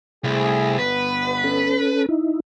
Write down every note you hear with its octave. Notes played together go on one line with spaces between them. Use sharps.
C2 A3 E4 G#4
G1 B3 B4
C#4 A4
D#4 E4